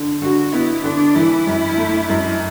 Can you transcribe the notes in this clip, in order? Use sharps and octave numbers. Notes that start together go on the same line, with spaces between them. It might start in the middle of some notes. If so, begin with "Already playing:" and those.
Already playing: D3
D3 F#4
B3 E4
D3 D4
E3 E4
F#2
A3
F#2